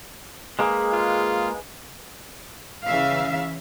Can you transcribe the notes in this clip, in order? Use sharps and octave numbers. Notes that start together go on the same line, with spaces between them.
G#3 A#3 G#4 B4
F4
C#3 E3 E5 F5